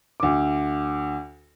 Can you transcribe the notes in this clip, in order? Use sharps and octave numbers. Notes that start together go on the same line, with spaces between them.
D2 D6